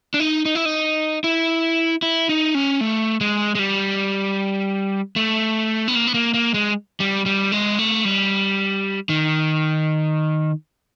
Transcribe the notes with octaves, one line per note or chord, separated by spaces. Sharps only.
D4
D#4
D#4
E4
D#4
E4
E4
D#4
C#4
A3
G#3
G#3
G3
A3
B3
A#3
B3
A#3
A#3
G#3
G3
G3
G#3
A3
G3
D#3